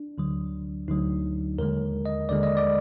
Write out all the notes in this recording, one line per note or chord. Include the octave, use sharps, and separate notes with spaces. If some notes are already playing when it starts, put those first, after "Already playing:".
Already playing: D4
D2 D3 F#3
D2 D3 F#3 D#4
D#2 D3 G#3 A#4
D#5
D#2 D3 G#3 D5
D#5
D5